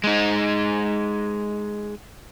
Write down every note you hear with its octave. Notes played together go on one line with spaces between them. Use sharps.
G#3 D#4